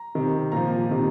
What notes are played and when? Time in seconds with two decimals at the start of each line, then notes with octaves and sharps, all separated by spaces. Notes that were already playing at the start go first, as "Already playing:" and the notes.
Already playing: A#5
0.15 C3 D#3
0.52 A#2 F3 A#5
0.90 C3 D#3